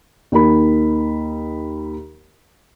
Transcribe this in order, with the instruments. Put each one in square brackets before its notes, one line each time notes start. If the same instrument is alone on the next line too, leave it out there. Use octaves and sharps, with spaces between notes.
[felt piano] D#2 D#4 A#4 B5